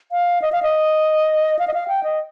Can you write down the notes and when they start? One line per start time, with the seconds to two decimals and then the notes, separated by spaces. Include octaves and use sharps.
0.12 F5
0.42 D#5
0.52 F5
0.63 D#5
1.59 F5
1.68 D#5
1.74 F5
1.88 G5
2.04 D#5